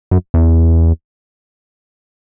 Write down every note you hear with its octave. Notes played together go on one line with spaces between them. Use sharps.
F#2
E2